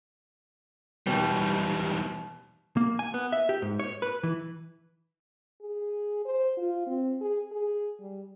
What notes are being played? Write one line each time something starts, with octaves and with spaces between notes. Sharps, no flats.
D#1 E2 B2 G3 G5
A#3
G#5
B3
E5
G4
G#2
C#5
B4
E3
G#4
C5
F4
C4
G#4
G#4
G3